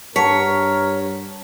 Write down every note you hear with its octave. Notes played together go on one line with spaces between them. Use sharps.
G2 A#4 C#5 F#5 A5 B6